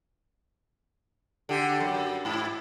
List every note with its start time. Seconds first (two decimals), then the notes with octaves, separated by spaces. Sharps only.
1.49 D3 G4
1.80 F#2
2.25 G#2 E4